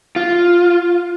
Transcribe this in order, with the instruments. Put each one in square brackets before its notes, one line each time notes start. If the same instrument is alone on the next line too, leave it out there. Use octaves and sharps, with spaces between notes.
[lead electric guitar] F4